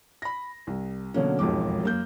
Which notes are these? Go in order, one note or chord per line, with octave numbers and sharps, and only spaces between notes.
B5 A#6
C2
B2 D3 F#3 A#3 C#4
E1 B1 F2 G#2 D6
F#2 A#3 G6